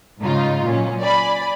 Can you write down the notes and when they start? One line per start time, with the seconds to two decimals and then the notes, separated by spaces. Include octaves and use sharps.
0.20 G#2 C#3 D#4 F4
0.64 A#2 F#3 C#4
1.01 D5 G#5 B5